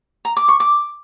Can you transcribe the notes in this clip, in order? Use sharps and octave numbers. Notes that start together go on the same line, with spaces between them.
A#5
D6
C#6
D6